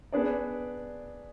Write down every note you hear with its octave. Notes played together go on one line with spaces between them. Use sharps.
B3 D4 G#4 D5